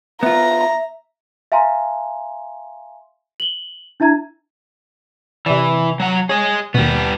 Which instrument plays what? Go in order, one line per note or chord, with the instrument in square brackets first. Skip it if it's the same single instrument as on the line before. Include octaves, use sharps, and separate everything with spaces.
[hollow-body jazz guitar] B3 F4 [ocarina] E5 [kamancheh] A#5
[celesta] E5 F5 G#5 A#5 C6
F#7 G7
D4 E4 E5 A#5 G#6
[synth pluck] C3 D5 [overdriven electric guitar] E3
[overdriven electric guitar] F#3 F#5
[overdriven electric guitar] G#4 D#5 [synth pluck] C#5
[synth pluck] D#2 B2 [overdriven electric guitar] G3 B3